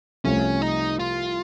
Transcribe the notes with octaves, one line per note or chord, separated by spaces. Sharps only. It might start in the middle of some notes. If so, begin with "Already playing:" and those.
C2 C3 F3 A3 C#4
D#4
F4